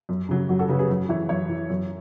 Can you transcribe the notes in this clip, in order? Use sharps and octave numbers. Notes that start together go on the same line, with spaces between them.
F#2
C#3 F#3
F#2 F#4
F#4 A4
C#3 F#3 G#4 B4
G#4 B4
F#2
E3 C#5 E5
F#2 C#5 E5
E3
F#2